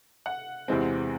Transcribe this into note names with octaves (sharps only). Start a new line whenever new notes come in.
F#5
E2 C3 E3 G#3 C4